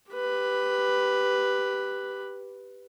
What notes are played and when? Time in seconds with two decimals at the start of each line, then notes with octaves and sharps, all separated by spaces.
0.12 G4 B4